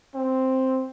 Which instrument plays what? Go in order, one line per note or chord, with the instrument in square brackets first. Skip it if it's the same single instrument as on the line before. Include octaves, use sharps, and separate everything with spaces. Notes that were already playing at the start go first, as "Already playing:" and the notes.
[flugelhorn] C4